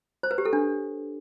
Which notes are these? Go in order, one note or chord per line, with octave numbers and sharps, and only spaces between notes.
C5
B4
G4
A4
D4